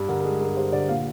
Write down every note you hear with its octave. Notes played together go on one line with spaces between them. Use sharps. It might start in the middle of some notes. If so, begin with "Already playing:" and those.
Already playing: G2
D3 A#4
A#4
G#3 G#4
G2 A#4
G2 C5
D3 D5
A#2 F5